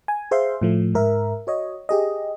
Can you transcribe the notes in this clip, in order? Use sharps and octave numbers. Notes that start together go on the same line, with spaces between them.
G#5
G#4 C5 E5 F5 C6
A2 F3 A3
G#2 A#4 E5
F#4 C#5 D#5
G4 G#4 D#5